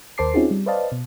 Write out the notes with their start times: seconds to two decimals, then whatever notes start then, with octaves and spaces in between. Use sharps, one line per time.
0.18 D#2 A#4 C5 A5 D6 C7
0.34 C4 C#4 D#4 F4 F#4 G#4
0.51 G3
0.66 B4 C5 D5 D#5 F5 A5
0.92 B2